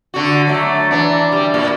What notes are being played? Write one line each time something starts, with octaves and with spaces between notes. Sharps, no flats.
D3 F#4
F#3 A3
E3 D4
G3
A#2